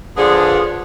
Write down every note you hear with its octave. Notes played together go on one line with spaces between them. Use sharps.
D3 F3 B3 G#4